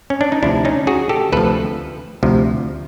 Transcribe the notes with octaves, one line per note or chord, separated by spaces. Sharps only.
C#4
D4
D#4
D2 C3 F3 D4 E4
C#4 D#4
F#4 G#4
G4 A4
D2 C3 F3 A4 B4
D2 C3 F3